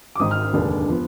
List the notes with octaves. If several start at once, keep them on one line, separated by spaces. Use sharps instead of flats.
D6
G#1 G#2 D#3 D#6
F6
F6
F1 D#2 D3 G#3 D4
F3 B3